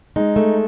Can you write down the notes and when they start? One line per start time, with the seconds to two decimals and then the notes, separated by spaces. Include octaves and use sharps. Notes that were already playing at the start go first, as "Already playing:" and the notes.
0.16 G#3 D#4
0.36 A3